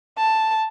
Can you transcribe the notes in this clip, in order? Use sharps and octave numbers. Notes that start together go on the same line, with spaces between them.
A5